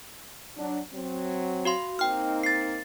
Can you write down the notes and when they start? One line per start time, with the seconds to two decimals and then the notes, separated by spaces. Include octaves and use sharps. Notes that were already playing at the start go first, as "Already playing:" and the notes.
0.57 F#3 D4
0.93 F#3 C4
1.65 F#4 F5 C6
1.99 A#3 C4 D#4 G5 F6
2.43 A6 C7